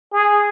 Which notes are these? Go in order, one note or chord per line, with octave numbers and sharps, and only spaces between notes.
G#4